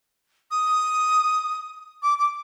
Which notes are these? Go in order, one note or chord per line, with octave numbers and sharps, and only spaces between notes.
D#6
D6
D6